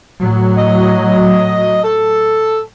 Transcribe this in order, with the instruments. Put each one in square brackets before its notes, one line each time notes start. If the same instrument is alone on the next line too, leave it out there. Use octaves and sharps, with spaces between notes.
[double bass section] A2 F#3
[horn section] D#5
A4